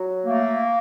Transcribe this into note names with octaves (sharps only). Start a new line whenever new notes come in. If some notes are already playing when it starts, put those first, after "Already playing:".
Already playing: F#3
A3 A#3